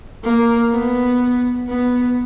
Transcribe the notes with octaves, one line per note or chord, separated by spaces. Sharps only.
A#3
B3
B3